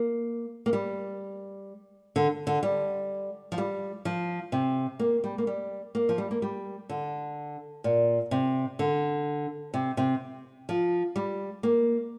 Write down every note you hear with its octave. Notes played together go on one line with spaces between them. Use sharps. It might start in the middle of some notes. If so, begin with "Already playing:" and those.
Already playing: A#3
A#3
G3
D3
D3
G3
F3
G3
F3
C3
A#3
G3
A#3
G3
A#3
F3
G3
A#3
G3
D3
A#2
C3
D3
C3
C3
F3
G3
A#3